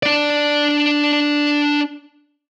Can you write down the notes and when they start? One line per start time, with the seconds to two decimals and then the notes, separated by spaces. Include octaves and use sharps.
0.03 D4 D5